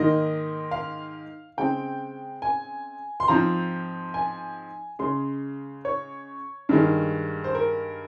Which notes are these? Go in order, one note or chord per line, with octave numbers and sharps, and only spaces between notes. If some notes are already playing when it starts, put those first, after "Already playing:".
Already playing: G#2 D#3 A#3 D#5
F5
C#3 G#3 C4 G5
G#5
C6
G#2 F3 C4 A#5
G#5
C#3 G#3 C#4 C6
C#5
G2 D#3 G#3
C5
A#4